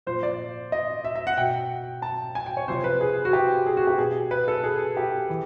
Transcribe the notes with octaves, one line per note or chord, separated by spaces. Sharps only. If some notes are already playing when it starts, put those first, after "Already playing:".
A#2 F3 C5
D5
D#5
E5
E5
F#5
B2 G5
A5
G#5
G5
C#5
C3 F3 C5
B4
G#4
F#4
G4
G#4
F#4
G4
B2 G#4
B4
A4
G#4
G4
E3